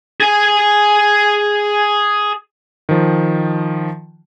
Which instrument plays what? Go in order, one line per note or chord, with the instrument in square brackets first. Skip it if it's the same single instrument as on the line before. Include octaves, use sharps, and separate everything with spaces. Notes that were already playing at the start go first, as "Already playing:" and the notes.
[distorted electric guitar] G#4 G#5
[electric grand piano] D#3 F3